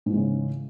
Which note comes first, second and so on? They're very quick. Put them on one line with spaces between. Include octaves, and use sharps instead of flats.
G#2 E3 G#3 C#3